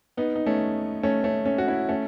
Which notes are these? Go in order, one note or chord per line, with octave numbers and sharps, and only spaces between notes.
B3 D#4
D#4
A3 C#4
A3 C#4
A3 C#4
A3 C#4
F#4
C#4 E4
A3 C#4